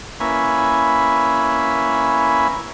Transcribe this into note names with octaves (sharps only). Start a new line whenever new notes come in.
A#3 C#4 E4 B4 G#5